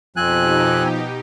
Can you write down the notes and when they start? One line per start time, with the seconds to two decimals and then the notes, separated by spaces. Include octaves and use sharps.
0.16 F2 B2 F3 C4 D#4 G4 G#5 F#6